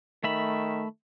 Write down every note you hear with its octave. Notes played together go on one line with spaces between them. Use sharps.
D#3 A3 E5 B5